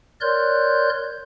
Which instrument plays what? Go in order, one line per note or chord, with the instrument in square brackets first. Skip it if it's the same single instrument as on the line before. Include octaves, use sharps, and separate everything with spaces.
[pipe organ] A#4 C#5 D5 C6 F#6 G6